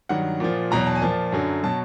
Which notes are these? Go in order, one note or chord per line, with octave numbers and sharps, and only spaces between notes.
G2 D#3 F#3 F#5
A#2 F3
E2 B2 F#3 A#5
A5
G#5
A#2 F3 A5
F#2 D3 F#3
B2 F#3 A5